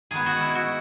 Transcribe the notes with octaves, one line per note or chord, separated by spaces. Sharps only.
D#3 G#3 B3 G#4
F#4
E4
F#4